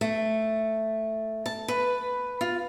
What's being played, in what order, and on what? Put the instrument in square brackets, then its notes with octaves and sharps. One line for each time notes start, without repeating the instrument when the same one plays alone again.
[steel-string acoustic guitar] A3
A5
B4
F4